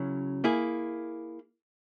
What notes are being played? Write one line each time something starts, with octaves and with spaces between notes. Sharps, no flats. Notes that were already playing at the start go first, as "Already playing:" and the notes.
Already playing: C#3 F#3 C#4 E4
A#3 E4 G#4